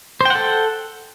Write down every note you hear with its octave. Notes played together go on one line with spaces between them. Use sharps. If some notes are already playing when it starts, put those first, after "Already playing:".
A4 C5 F#5 G5